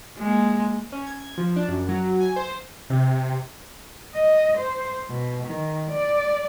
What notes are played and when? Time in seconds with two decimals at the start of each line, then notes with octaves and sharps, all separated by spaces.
0.18 G#3 A#3
0.92 C#4
1.07 G#6
1.38 F3
1.56 D4
1.68 F#2
1.89 F#3
2.20 G#5
2.36 C5
2.90 C3
4.15 D#5
4.58 C5
5.10 B2
5.45 D#3
5.91 D5